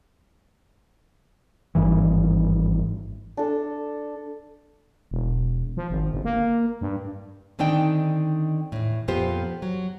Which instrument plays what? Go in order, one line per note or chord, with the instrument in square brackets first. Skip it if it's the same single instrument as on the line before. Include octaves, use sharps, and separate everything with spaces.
[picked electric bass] G#1 G2 E3
[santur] D4 A4
[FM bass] E1
F3
G#1
G1
A#3
G2
[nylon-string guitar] D3 D#3 C4 D4 D#4 G5
E2 A2
F2 A#2 B3 F4 G4 C5
F#3